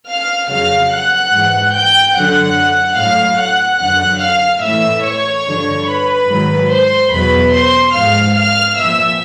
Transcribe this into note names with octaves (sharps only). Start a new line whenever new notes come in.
F5 F6
F2 C#3 F#3 F5 F6
F#5 F#6
G#2 E3
G5 G6
F#2 D3 F#3 F#5 F#6
A2 F#3 F5 F6
F#5 F#6
F#2 D3 F#3 F#5 F#6
F5 F6
A2 E3 E5 E6
C#5 C#6
G2 D3 F3
B4 B5
G#2 D#3 F#3
C5 C6
E2 B2 F#3 B4 B5
C5 C6
G#2 F3 F5 F6
F5 F6
A#2 F3 E5 E6